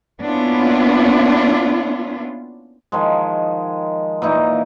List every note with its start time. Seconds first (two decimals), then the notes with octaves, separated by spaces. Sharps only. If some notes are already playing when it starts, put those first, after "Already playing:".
0.20 A#3 B3 C#4 D4 E4 F4
2.92 D#3 F3 G#3
4.22 A#2 E3 D#4 E4